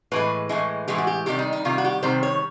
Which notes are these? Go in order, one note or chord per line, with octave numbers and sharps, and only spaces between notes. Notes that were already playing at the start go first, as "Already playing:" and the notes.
A2 E3 G#3 B4
A2 E3 G#3
A2 E3 G#3 G4
F#4
G4
C3 D#3 G3 G4
D#4
D#4
C3 D#3 G3 F4
F#4
G4
C3 D#3 G3 C5
C#5